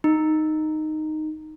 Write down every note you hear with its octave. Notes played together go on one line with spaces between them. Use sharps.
D#4